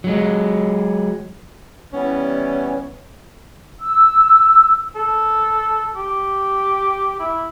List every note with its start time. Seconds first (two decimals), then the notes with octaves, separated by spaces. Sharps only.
0.04 F#3 G#3
1.93 E3 G3 B3 C#4
3.80 E6
4.95 A4
5.96 G4
7.20 E4